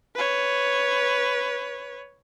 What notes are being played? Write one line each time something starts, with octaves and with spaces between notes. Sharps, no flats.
B4 C#5